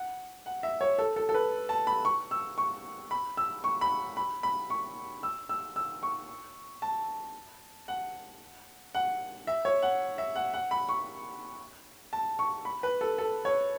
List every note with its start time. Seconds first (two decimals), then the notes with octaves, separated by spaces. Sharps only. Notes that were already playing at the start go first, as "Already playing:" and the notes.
Already playing: F#5
0.46 F#5
0.63 E5
0.81 C#5
0.98 A4
1.16 A4
1.29 A4
1.34 B4
1.69 A5
1.87 B5
2.05 C#6
2.31 E6
2.58 C#6
3.11 B5
3.37 E6
3.64 C#6
3.81 B5
4.17 B5
4.43 B5
4.70 C#6
5.23 E6
5.49 E6
5.76 E6
6.03 C#6
6.82 A5
7.88 F#5
8.95 F#5
9.47 E5
9.65 C#5
9.82 F#5
10.18 E5
10.36 F#5
10.54 F#5
10.71 B5
10.89 C#6
12.13 A5
12.39 C#6
12.65 B5
12.83 B4
13.01 A4
13.18 A4
13.45 C#5